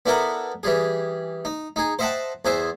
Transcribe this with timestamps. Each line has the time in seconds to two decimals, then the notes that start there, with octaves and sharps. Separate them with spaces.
0.06 B3 D4 E4 A4 A#4 F#5
0.63 E3 G3 G#4
1.45 D#4
1.76 D#4 G#4
1.99 C5 D#5 E5 F#5 G5 A5
2.45 E2 G#4 C5 E5